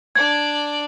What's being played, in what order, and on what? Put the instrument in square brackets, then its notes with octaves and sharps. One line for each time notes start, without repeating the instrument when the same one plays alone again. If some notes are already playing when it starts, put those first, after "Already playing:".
[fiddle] D4 D5 [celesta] G#6